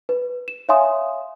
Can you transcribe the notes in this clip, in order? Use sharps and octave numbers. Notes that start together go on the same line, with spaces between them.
B4
E7
C#5 E5 F5 G#5 C6 D#6